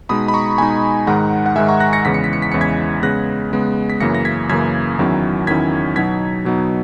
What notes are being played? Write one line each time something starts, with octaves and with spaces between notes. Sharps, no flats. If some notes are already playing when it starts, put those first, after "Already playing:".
B2 G#3 D#4 B5 D#6
B5
A#5 C#6
B2 G#3 D#4 G#5 B5
G#2 D#3 G#3 F#5 A#5
F#5
G#2 D#3 G#3 E5 G#5
A#5 C#6
F#6 A#6
A#6 C#7
E2 C#3 E3 G#3 B6
C#7
B6
C#7
B6
E2 C#3 E3 G#3 C#7
G#6 B6
C#3 G#3 B3 F#6 A#6
C#3 G#3 B3
B6
F#2 C#3 E3 A#3 A#6 C#7
A#6
G#6 B6
F#2 C#3 E3 A#3 G#6 B6
E2 D#3 F#3 C#4 E4
E2 D#3 F#3 C#4 E4 G#6 B6
B2 F#3 B3 D#4 G#6 B6
B2 F#3 B3 D#4